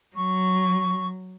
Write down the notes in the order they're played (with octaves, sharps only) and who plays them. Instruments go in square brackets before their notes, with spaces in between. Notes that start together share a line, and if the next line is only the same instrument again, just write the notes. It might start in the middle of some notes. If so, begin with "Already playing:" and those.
[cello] F#3 [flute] C#6